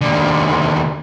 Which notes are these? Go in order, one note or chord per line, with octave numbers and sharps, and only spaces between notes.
D#2 D3